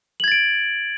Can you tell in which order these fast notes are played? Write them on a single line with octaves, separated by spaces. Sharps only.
F#7 G#6 A6 D7